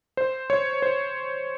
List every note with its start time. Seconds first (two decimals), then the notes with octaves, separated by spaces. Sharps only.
0.17 C5
0.50 C#5
0.82 C5